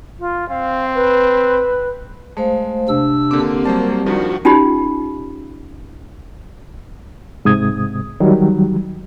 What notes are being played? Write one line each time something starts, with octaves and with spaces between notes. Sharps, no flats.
F4
C4 F5
B4
G#3 A3 C5 F5
C3 D4 E6
D3 A#3 C4 G4 D6
F#3 G3 C5 A5
G2 D#3 F3 F#4
C#4 D#4 F4 G4 B5
G#2 C3 D#6 G#6
D#3 F#3 G3